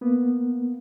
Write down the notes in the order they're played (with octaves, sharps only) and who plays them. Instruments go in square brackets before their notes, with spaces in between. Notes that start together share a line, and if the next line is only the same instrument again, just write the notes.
[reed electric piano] A#3 B3